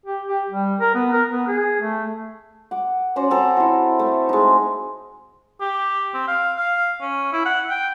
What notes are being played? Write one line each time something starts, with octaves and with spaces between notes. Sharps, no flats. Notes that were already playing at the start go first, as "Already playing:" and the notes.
G4
G4
G3
A#4
B3
A#4
B3
G#4
A3
F#5 D6
C#4 F#4 C5 D5
C4 A4 A#5
E4 F#4
A3
G#3 D#4
G4
C4
F5
F5
C#4
E4
F#5
G5